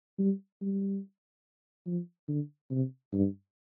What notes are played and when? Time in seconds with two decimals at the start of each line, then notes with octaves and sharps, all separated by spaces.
0.19 G3
0.61 G3
1.86 F3
2.28 D3
2.70 C3
3.13 G2